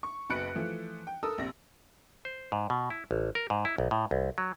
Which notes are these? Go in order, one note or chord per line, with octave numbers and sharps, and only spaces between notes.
C#6
F#1 B1 B4 F#6 C#7 D7
E3 F3 A3
G5
A4 A#4 D#6 E6
A#1 C3 A#6
C5
G#2
B2
E4
A1
A#4
G#2
E4
B1
A2
C2
F#3